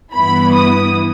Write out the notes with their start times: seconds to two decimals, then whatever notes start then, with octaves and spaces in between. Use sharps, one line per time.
0.14 G2 E3 B3 E4 B5
0.55 D#6